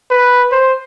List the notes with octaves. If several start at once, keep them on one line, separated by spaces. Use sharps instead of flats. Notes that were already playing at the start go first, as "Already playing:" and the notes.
B4
C5